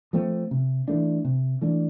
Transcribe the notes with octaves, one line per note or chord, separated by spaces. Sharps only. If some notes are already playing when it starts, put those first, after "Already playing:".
F3 A3 C4
C3
E3 A3 D4
C3
E3 A3 D4